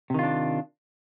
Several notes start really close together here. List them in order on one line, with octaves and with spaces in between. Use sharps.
C3 D#3 F4 D4